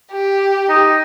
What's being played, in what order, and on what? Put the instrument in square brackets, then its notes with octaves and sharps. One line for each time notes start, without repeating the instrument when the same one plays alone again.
[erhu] G4
[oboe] D#4